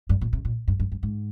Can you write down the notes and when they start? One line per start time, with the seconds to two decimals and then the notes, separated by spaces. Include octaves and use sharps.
0.09 G2
0.21 A#2
0.33 C3
0.45 A#2
0.68 G2
0.80 G2
0.92 G2
1.03 G#2